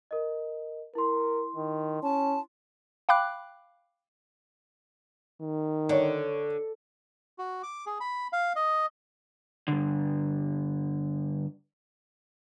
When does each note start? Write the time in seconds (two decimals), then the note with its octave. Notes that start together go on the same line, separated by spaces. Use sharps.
0.11 A#4 D#5
0.95 E4 A#4 C6
1.56 D#3
2.03 C#4 A5
3.09 F5 G5 B5 D6 F#6
5.41 D#3
5.89 D3 C#5 D5
7.38 F#4
7.63 D6
7.86 G#4
8.00 B5
8.33 F5
8.56 D#5
9.68 G2 D3